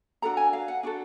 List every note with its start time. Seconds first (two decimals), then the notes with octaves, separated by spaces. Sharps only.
0.22 D4 F#4 A4 A#5
0.37 G#5
0.53 F5
0.68 F#5
0.83 D4 F#4 A4